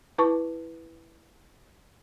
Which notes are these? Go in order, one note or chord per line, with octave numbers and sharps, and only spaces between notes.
E4 B4 A5 C#6